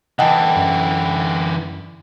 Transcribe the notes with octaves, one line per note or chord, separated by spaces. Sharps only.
D3 E3 D#5 F#5 G5 A5
F#2